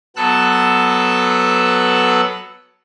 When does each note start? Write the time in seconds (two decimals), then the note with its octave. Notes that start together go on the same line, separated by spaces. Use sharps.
0.16 F#3 B3 A4 E6 F#6